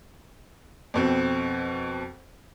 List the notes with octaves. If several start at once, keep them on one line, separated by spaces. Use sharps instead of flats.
F2 B2 C4